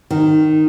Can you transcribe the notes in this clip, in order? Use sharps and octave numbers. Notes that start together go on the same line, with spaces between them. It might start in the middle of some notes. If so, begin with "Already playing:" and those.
D#3